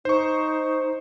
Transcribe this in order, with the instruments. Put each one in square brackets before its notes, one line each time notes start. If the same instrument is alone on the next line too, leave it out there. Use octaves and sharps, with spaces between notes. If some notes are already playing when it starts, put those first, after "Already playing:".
[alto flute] D#4 [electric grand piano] C5 C#6